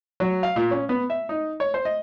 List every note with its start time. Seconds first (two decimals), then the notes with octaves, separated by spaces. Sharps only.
0.20 F#3
0.43 F5
0.56 A#2
0.71 C#4
0.89 B3
1.10 E5
1.29 D#4
1.60 C#5
1.74 C5
1.85 D#5